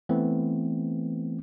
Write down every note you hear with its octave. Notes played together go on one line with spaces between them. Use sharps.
E3 A3 B3 C4